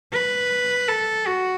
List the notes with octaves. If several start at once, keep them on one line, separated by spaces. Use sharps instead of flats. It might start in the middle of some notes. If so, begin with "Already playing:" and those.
B4
A4
F#4